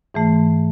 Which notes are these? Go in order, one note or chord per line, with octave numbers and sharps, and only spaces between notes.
G#2 E3 A3